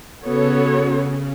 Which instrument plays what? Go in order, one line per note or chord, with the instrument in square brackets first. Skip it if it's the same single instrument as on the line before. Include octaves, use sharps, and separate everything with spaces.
[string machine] C#3 [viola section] B3 F#4 A4 C#5